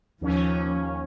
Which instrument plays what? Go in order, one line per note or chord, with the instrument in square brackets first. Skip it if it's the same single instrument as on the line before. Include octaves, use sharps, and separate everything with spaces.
[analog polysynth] D#2 C#4 [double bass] F3